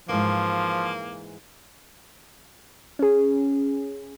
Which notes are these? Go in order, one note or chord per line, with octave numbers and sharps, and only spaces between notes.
G#2 E3 F3 A#3
C#4 G#4